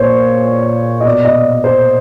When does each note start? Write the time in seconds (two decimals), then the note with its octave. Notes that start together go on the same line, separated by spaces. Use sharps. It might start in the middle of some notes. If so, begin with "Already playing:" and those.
Already playing: A#2 C5 C#5
1.00 D#5
1.05 B2 D5
1.25 D#5
1.64 C5